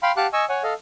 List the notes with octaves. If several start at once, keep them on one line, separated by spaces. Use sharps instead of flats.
F5 G5 B5 C6
G4 F5 F#5 A5 D6 F#6
D#5 G#5 C#6 E6
C#5 F#5 G#5
A4 D#5 F5